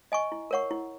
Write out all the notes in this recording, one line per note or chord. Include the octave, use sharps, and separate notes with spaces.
D#5 G#5 C#6
E4
A#4 C#5 F#5 C#6
E4